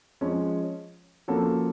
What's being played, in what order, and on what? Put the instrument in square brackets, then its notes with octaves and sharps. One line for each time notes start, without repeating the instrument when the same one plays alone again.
[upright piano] F3 G#3 C#4
F3 A#3 C#4 F#4 A4